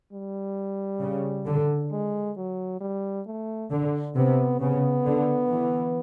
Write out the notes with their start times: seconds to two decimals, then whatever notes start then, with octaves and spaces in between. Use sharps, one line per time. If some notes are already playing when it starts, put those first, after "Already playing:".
0.13 G3
1.02 C#3
1.47 D3
1.91 G#3
2.37 F#3
2.81 G3
3.26 A3
3.71 D3
4.16 C3 B3
4.61 C#3 B3
5.05 D3
5.51 E3